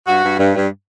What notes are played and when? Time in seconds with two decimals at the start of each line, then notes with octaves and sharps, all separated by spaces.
0.07 G2 F#4
0.23 G2
0.39 G2
0.55 G2